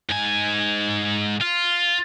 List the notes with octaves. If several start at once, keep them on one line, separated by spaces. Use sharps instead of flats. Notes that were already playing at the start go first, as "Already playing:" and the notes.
G#2 G#5
F4